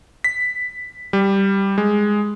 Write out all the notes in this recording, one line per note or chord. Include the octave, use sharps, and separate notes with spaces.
B6
G3
G#3